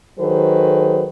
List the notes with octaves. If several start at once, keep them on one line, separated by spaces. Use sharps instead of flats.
D#3 F#3 G#4 A4 B4 C5